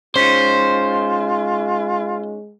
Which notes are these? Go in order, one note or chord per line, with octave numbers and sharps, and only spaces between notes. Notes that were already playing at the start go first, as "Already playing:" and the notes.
G#3 C#4 D#4 F4 C5